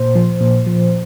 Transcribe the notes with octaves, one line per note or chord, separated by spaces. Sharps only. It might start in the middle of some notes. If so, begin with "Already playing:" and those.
Already playing: A#2 C5
F3
A#2
F3